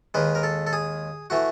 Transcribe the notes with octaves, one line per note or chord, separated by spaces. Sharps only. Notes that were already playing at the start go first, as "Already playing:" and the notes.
D#2 D#3 G#3 B4
A#4
A4
A4
G#4
E3 A3 F#4